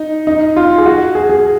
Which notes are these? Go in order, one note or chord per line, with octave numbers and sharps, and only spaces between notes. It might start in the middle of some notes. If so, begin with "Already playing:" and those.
Already playing: D#4
D#4
F4
G#4
F#4
G#4
G#4